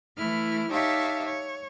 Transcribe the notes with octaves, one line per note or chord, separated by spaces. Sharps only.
E3 A3 E4 F6
D#4 G4 C#5 E5 F5 A5
C#5